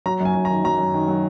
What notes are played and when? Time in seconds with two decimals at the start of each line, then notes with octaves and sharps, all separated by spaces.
0.06 F#3 A#5
0.20 F#2 G#5
0.35 F#2
0.45 A#5
0.50 D#3
0.64 F#3 A#5
0.79 F#2
0.94 D#3
1.08 F#3